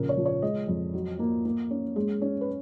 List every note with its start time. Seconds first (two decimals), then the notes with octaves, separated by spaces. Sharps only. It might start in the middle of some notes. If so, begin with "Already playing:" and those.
Already playing: A#1 C#3 A#4
0.09 C#5
0.17 F3
0.25 C#5
0.42 G#3 D#5
0.68 F2
0.94 F#3
1.19 A#3
1.45 A#3
1.71 C#4
1.96 G#3
2.22 C#4
2.41 B4